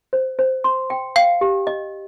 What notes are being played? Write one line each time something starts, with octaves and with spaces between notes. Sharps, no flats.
C5
C5
C6
G5
F5 G5
G4
D#5